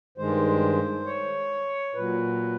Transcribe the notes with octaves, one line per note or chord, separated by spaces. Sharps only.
G2 D#3 G#3 C5
C#5
A#2 F#3 B4